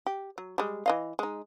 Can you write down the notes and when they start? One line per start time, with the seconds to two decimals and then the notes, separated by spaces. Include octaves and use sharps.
0.06 G4
0.38 F#3
0.58 G3 G#3
0.86 E3 D#5 F5
1.19 G#3 D#4